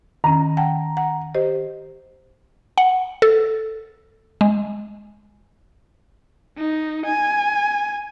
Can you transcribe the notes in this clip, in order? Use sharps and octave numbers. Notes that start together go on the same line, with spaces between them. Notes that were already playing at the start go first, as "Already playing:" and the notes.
D#3 C#4 A#5
F#5 G5 A5
F#5
G4 C5 D#5
F#5
A4
G#3
D#4
G#5